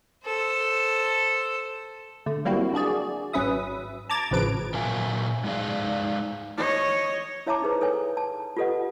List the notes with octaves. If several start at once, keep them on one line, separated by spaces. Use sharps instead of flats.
A4 C5
D3 A3
F#3 G3 A#3 C4 E4 F#4
D4 F#4 G#4 D5
G#1 F#3 C#4 B4 E5 D#6
A5 A#5 D6 G#6 A6
G#1 A2 C#3 F3 B4 D7
A#2 F#3 A#4 E5 F5 G#5
G#3 D#4 G#4 D5 F5
C#5 D#5
E4 C#5 E5 A5 A#5 D6
D#4 G#4 B4 C5
A4 B4 C#5 G#5
A5
F4 G4 A4 B4 D#5 F#5